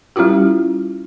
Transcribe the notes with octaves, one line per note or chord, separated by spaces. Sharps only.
G3 C#4 E4 F4 G4